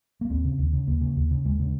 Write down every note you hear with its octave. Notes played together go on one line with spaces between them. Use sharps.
A#3
D#2 C4
C#3
D#2
C#3
D#2 A#3
C#3
D#2
C#3
D#2 G#3
C#3